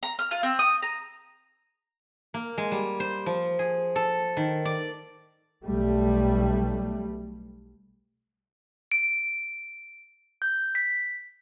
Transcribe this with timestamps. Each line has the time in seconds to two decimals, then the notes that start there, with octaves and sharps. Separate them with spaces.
0.03 A#5
0.19 F6
0.31 F4
0.43 C4
0.59 D#6
0.82 A#5
2.34 A#3
2.58 G#3
2.72 G3
3.00 C5
3.26 F3
3.59 G#4
3.96 A4
4.37 D#3
4.65 D5
5.65 B1 G3 A3
8.92 D7
10.42 G6
10.75 B6